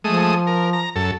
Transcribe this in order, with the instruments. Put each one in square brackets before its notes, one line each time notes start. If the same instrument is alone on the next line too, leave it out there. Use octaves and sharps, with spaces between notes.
[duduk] F3 [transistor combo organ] G#3 A3 D#6
[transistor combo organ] A#4
A#5
F#2 A4